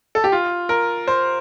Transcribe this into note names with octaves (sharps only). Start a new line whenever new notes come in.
A4
G4
F4
A#4
C5